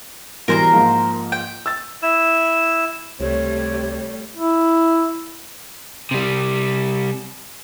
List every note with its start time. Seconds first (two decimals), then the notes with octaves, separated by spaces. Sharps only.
0.48 B2 E3 G3 A#4 C5 A#5
0.73 G#2 F3 A#3
1.32 G5
1.66 E6 A6
2.02 E4 E6
3.20 C#2 C3 G3 A3 C#5
4.37 E4
6.11 C3 G3